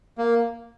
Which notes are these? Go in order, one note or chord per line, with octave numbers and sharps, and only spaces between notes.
A#3